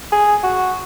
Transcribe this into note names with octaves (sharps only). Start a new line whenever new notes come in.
G#4
F#4